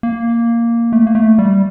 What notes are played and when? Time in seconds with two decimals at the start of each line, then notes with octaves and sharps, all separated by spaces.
0.03 A#3
0.93 A3
1.07 A#3
1.15 A3
1.38 G3